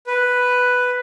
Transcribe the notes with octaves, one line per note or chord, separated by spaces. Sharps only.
B4